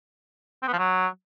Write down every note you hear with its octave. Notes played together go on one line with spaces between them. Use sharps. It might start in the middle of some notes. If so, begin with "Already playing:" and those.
C4
B3
F3
F#3